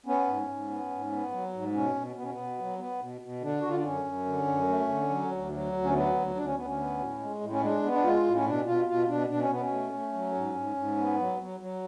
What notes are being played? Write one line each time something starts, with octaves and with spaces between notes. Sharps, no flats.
B3 C#4
G#2
G#2
B3
G#2
B3
F#3
G#2
B2 C#4
B2
B2 B3
C#4
B3
B2
F#3
B3
B2
B2
D3 D4
D3 F#4
F4
D4
F#2 C#4
F#2
D3
F#2
A3
D3
F#3
D2
F#3
D2
C#4
F#3 B3
D2
D2 D4
C#4
D2 B3
C#4
B3
A2
G#3
A2
C#4
G#3 D4
B3
D4
G#3 F4
A2
C#4
B2 D4
B2 F4
B2 F4
B2 D4
B2 D4
C#4
B2 B3
C#4
A3
A3
F#3
G#2
G#2
G#2
B3
F#3
F#3
F#3